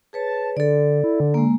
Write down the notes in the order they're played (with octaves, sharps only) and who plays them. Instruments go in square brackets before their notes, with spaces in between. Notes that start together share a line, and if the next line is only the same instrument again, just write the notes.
[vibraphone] G#4 B4 C#5 [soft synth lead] A5
[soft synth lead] D3 [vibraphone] A4 D5
[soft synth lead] E4
D3
[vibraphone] G#3 A#3